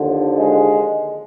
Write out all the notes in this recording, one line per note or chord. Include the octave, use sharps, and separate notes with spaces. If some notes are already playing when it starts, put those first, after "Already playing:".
Already playing: D#2 D3 F3
G#3